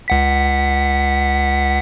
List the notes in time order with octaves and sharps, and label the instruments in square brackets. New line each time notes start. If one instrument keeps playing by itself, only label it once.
[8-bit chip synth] C#2 F#5 B6